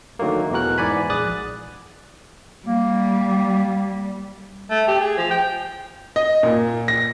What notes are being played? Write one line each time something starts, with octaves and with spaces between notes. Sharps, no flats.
D3 D#3 F#3 A3 A#3
E2 B2 E3 F#4 A#4 F#6
G#2 E3 D5 F#5 G#5 B5
A#1 G#4 D5 D#6 F#6 A6
G3 A#3
A3
G4
G#4
F3
G5
D#5
A#2
A#6